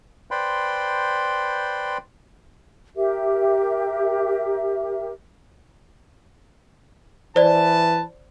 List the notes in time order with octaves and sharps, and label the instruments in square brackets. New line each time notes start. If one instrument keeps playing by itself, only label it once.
[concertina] B4 C5 D5 G5 B5 C6
[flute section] G4 A#4 E5
[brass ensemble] E3 B4 A5 [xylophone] C5 D5